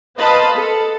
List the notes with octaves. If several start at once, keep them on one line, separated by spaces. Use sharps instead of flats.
B4 C5 D#5 F5 A5 B5
A4